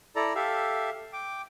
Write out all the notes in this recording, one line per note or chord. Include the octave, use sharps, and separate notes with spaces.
E4 A4 D5 A#5
G4 A4 E5 F5
G5 D6